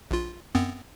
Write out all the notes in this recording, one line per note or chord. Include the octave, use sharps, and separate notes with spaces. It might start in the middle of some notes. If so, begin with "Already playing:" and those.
A#1 F4
F#2 B3 C4